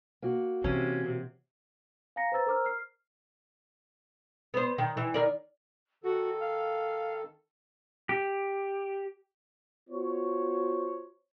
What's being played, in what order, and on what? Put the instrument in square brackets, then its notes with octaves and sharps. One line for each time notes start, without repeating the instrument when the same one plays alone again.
[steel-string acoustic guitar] A#3 F#4
[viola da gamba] C3 [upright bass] E3 [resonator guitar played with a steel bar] C#4
[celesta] F5 G#5 A#5 A#6 C#7
B4 C5 A#5 E6 A6
A#4 C5 A#5 D6 E6 F6
F6 C7
[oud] B3 C5
D#3
E3
D#3 A#4 D5
[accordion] D#3 A4 [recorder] F#4
[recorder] F5
[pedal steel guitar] G4
[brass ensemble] B3 F4 F#4 C5 C#5